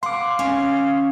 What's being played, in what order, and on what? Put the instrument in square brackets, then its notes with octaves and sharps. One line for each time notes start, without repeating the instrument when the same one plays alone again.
[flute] F5 [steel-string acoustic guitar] F#5 [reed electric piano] C6 D6
[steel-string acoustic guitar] C#4